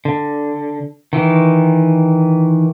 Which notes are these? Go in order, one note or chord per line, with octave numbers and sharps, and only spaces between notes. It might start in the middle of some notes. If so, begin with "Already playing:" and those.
D3
D#3 E3